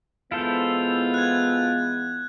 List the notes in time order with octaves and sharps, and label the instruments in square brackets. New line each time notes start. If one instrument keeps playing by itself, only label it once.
[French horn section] E3 G#3 B3 [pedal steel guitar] E4 A4 C5 [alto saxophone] F4
[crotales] F#6 G#6